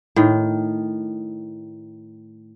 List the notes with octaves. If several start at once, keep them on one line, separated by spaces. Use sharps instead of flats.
A2 D#3